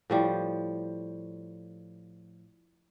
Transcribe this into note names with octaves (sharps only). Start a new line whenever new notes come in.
A2 F3 G3